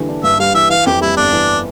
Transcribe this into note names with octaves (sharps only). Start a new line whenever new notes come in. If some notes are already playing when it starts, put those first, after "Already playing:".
Already playing: D3 E3 G3
D4
G2 E5
G3 F5
E3 E5
E3 F5
F2 G4
G3 E4
G1 D4
E3